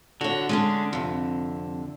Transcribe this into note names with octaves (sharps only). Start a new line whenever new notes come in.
D3 F#4 C#5
G#3 C#4 D4
F2 C3